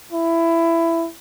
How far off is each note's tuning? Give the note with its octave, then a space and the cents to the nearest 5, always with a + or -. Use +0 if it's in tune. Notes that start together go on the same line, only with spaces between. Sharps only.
E4 +15